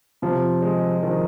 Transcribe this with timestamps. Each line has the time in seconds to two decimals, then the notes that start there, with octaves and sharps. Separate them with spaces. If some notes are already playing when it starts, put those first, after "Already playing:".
0.22 C3 F3
0.62 G#3
1.03 D#3 F3